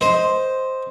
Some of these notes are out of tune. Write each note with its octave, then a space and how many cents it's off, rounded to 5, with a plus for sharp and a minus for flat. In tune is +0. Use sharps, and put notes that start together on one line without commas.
C5 +0 D#5 +15